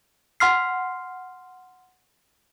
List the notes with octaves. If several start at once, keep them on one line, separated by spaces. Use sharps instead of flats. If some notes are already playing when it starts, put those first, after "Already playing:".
F#5 C6 F6 C7